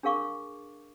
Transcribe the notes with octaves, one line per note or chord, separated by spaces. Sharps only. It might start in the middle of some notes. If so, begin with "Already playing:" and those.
D4 G#4 A#4 F5 C#6 D6